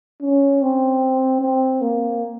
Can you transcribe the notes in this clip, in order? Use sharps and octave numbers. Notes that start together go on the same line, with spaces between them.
C#4
C4
C4
A#3